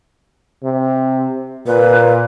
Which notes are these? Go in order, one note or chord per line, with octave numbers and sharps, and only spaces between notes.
C3
A#2 B4